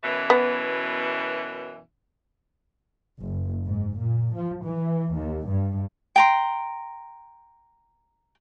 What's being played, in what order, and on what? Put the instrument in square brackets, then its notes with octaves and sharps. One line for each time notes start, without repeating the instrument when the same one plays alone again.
[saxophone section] F#2 B2 E3
[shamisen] B3
[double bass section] F#1
G#2
A#2
F3
E3
D#2
G2
[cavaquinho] G5 A#5 C6